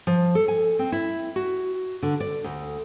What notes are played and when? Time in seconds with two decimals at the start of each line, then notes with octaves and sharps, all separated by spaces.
0.07 F3
0.35 A4
0.48 G#5
0.79 C4
0.92 E4
1.36 F#4
2.02 D3
2.20 D5
2.44 D2